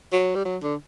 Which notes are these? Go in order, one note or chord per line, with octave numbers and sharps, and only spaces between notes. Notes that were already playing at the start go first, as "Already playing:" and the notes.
F#3
G3
F#3
D3